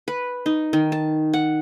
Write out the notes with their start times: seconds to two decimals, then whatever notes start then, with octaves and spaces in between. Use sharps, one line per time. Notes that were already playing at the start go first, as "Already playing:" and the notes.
0.08 B4
0.46 D#4
0.73 D#3
0.92 A5
1.33 F#5